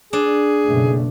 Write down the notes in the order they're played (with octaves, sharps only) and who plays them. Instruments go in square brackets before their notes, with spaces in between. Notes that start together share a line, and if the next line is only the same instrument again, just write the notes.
[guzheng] D4 [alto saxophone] G#4
[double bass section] F#1 B2 A3